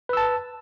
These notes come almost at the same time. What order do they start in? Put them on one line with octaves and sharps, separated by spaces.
B4 E6 A5